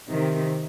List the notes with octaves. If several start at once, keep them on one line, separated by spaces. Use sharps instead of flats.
C3 D#3